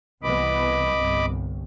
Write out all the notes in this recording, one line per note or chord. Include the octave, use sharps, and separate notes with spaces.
C2 E3 B3 D#5 B5 D6
G1 C2